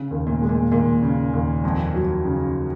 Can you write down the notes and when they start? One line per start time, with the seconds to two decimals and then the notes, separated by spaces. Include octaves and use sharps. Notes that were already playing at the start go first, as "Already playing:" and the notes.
Already playing: C#3
0.11 D#2
0.27 A#2
0.41 G#3
0.49 A#2
0.72 D#2 A#2
1.02 C#3
1.33 D#2
1.64 F2
1.94 F#3
2.25 C#3